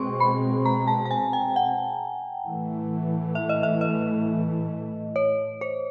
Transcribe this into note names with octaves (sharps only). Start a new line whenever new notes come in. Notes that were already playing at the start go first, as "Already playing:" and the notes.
Already playing: B2 G#3 C4 C6 C#6
B5
A#5
A5
A5
G#5
G5
F#5
A2 E3 A3
E5
D#5
E5
D#5
C#5
C5